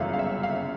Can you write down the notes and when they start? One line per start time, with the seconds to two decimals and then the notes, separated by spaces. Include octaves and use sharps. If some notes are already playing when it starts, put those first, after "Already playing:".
Already playing: G1 F#2 C#3 E3 G#3 E5 F5
0.13 F5
0.19 E5
0.43 F5